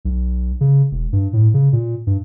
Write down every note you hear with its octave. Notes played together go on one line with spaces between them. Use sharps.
B1
C#3
E1
G2
A2
C#3
A#2
G2